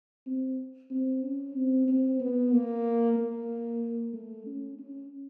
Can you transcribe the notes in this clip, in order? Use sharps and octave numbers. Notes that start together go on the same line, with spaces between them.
C4
C4
C#4
C4
C4
B3
A#3
A#3
A3
C#4
C#4